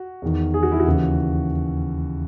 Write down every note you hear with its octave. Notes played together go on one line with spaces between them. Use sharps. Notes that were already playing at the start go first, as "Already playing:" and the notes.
Already playing: F#4
E2 D#3
G#4
F#4
E4
F#4
D#2 C#3 E3